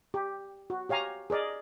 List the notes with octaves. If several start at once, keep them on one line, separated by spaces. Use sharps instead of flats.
G4
F#4
G4 C#5 F5 G#5 A#5
G#4 A#4 D5 D#5